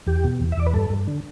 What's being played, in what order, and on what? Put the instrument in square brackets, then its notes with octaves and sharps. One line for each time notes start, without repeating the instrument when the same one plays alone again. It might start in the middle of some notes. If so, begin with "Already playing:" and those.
[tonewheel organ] E2 G4
B2
E2
E5
E2 D5
B4
G2 A4
G2
D3